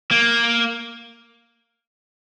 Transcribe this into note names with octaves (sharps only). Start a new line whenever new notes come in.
A#3